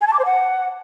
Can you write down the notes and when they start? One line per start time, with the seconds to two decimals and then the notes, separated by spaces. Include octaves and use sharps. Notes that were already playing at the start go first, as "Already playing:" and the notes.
0.01 G#5
0.07 A5
0.13 D6
0.19 C5
0.25 F#5